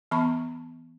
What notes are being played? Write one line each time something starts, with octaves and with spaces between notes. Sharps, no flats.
E3 B3 A5 B5 C#6